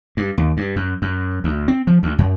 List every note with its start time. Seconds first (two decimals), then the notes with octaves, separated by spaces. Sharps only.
0.17 G2
0.38 D#2
0.57 G2
0.76 F#2
1.02 F#2
1.44 D2
1.68 C4
1.87 F3
2.03 D2
2.18 F#2